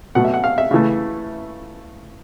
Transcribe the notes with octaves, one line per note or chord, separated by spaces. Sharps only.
B2 F#3 A3 F#5
E5
F#5
F5
E5
C#3 E3 A3